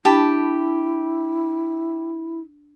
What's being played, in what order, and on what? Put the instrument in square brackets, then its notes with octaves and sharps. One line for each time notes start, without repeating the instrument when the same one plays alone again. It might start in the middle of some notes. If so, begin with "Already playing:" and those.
[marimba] D4 [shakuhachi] E4 [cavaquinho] G4 A5 B5